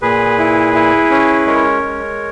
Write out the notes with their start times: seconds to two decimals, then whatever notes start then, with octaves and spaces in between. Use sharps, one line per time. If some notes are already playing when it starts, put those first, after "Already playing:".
0.02 A#2 G#4 B4
0.38 E4
0.74 E4
1.10 C#4
1.46 G#3 A#4 C#5
1.83 G#3